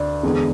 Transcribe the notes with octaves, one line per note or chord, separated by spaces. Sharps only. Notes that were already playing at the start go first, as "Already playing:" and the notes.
Already playing: D2 D5
E2 D3 G#3